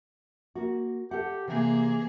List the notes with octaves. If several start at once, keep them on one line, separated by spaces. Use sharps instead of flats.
A#3 F#4
G4 A4 F#5
C3 E3 A#3 G#4